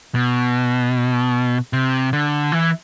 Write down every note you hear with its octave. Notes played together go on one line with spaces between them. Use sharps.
B2
C3
D3
E3